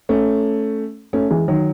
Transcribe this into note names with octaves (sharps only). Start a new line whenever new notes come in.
A3 C#4
A3 C#4
E3 G#3
D#3 F#3